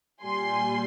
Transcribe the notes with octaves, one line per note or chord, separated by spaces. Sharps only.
A#2 G3 G#5 C6